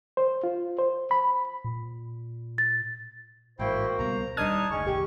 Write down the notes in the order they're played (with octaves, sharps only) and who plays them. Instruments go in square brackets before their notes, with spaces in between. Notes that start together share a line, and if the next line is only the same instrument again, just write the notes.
[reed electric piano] C5
F4
C5
B5
[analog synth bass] A#2
[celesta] A6
[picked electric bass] A1 G#2 [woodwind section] A#3 F#4 C5 [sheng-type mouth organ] E4 G5
[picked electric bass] C#2 B2 G3 [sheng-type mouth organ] A#5
[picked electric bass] D#1 G3 [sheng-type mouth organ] D4 A5 [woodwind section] D#4 [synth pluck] D#6 F6 G#6
[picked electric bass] F#1 D2 [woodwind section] G#3 A3 C#4 [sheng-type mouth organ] C#6
[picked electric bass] F1 A#1 D#3 [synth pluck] G4